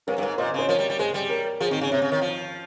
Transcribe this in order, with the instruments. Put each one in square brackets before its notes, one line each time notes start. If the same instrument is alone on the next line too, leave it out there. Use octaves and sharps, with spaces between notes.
[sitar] G2 [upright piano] A#4 C#5
[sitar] G2
G#2
[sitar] A#2 [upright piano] C5 D#5
[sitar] C#3 [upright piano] C5 D#5
[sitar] F3 [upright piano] A#4 C#5
[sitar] G3
G3
[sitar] G#3 [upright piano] G#4 C5
[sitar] G3
[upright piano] A#4 C#5
[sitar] F3 [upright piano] G#4 C5
[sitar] D#3 [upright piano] C4 D#4
[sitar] C#3 [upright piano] C#4
[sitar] C3 [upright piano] C4
[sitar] C#3
D#3
F3